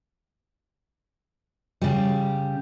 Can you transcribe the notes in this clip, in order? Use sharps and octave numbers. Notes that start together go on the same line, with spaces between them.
C#3 G3